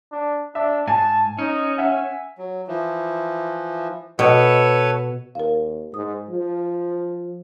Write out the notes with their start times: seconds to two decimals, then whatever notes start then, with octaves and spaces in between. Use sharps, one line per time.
0.12 D4
0.55 D4 E5
0.88 G#2 G#5 A5
1.39 C#4 D#4
1.78 E5 F#5 G#5
2.38 F#3
2.68 E3 F3
4.19 B2 A4 B4 C#5
5.35 D#2 A#4 F5
5.94 G#2 D#6
6.29 F3